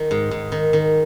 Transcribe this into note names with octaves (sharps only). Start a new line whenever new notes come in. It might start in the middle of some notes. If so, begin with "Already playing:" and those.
Already playing: D#3
G#2
G#2
D#3
D#3